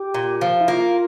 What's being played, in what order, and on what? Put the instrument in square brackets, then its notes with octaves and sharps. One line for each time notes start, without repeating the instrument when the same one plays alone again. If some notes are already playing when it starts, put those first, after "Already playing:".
Already playing: [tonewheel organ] G4
[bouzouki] A#2
F3
[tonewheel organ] E4
[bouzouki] A#3 [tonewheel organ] F4